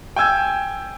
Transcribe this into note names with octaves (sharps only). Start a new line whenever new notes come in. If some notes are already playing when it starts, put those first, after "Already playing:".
G5 G#5 E6 G#6